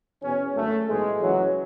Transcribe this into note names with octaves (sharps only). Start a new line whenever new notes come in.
E2 B2 C#4
G#1 F#2 D3 A3
B1 A2 E3 G#3
C#2 C#3 E3 F#3